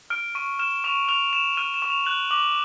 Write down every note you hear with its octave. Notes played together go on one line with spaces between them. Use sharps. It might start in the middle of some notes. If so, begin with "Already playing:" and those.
F6 D7
C#6 D#7
F6 E7
C#6 F7
F6 F7
C#6 E7
F6 D#7
E7
C#6
F7
F#6 F#7
D6 F#7